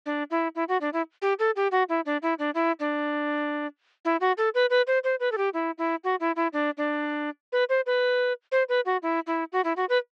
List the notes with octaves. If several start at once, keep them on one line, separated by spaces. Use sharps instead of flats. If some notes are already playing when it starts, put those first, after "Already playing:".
D4
E4
E4
F#4
D4
E4
G4
A4
G4
F#4
E4
D4
E4
D4
E4
D4
E4
F#4
A4
B4
B4
C5
C5
B4
A4
G4
E4
E4
F#4
E4
E4
D4
D4
B4
C5
B4
C5
B4
F#4
E4
E4
F#4
E4
F#4
B4